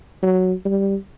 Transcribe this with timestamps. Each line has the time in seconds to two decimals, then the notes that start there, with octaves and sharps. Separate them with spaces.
0.23 F#3
0.65 G3